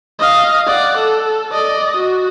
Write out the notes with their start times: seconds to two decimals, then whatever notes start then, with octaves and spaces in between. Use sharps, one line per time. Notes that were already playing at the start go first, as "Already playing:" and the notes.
0.19 D#5 F5
0.67 D5 F#5
0.98 A4
1.52 D5 D#5
1.97 F#4